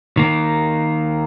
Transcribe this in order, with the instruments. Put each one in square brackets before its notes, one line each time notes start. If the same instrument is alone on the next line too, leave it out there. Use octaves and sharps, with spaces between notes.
[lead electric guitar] D#3 A#3